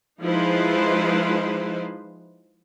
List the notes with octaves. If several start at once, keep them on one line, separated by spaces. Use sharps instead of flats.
F3 G#3 D#4 E4 B4 C5